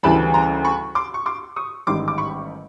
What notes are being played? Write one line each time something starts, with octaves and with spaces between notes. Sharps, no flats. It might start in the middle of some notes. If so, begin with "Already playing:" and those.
D2 C#3 E3 G3 A5 B5
A#5 C6
B5 C#6
C6 D6
C#6
C6 D6
C#6 D#6
A1 G#2 D#3 G3 C6 D6
D6
B5 C#6